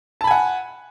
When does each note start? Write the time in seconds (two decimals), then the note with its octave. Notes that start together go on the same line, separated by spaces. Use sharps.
0.21 A5
0.24 B5
0.27 G#5
0.31 F#5